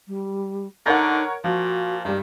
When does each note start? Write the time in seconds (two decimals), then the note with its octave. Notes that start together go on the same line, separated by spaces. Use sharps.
0.07 G3
0.86 D3 D#4 A#4 C#5 F#5
1.44 A#2 F3 F#4
2.05 G2 D#3 G3